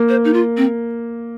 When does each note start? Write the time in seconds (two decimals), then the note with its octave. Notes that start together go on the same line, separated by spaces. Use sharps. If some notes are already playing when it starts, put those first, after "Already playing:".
Already playing: A#3
0.09 C5
0.24 D#4
0.33 F4
0.57 C4